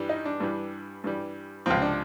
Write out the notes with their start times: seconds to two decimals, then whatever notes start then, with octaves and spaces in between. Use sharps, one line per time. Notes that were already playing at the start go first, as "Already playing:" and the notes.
Already playing: G2 E3 G3
0.09 D#4
0.25 D4
0.40 G2 E3 G3
1.04 G2 E3 G3
1.66 C#2 C3 F3 C4
1.82 D4